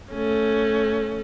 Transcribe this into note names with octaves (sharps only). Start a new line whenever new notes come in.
A3 C#4